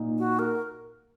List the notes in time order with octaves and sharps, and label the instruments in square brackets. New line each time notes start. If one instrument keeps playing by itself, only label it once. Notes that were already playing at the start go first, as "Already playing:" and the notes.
Already playing: [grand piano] A#2 A#3 D#4
[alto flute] F#4
A#4